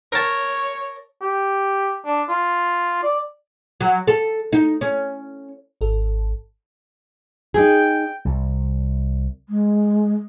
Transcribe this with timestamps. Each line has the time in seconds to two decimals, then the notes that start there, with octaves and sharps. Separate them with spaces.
0.12 A#4 C#5 A5
1.21 G4
2.05 D4
2.29 F4
3.03 D5
3.80 F#3
4.07 A4
4.52 D#4
4.81 C#4
5.81 G#1 A4
7.54 D#4 G#4 G5
8.25 C2
9.49 G#3